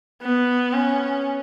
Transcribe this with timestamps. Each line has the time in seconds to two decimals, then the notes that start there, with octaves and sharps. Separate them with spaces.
0.22 B3
0.73 C#4